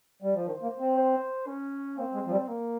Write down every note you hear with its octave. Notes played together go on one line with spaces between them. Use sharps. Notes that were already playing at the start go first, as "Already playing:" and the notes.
G3
F3
D#3 C5
A#3
C4
C5
C#4
A#3 C4
G#3
F3
G3
A#3